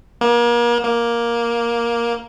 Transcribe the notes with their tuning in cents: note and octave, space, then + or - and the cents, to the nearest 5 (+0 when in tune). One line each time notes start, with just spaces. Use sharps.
A#3 +35
A#3 +10